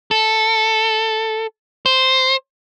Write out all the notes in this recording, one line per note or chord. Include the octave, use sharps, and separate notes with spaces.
A4
C5